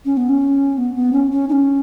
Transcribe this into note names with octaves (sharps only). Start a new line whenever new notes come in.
C#4
B3
C#4
B3
B3
C#4
C#4
D#4
C#4